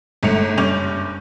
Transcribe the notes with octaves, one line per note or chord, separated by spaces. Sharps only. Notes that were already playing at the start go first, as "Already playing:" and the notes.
G1 G#2 A3 C#7 F7
F#1 G2 C#4 D6 G6 F7